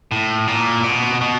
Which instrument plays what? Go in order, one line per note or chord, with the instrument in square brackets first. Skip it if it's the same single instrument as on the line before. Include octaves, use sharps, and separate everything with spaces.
[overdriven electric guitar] A2
A#2
B2
B2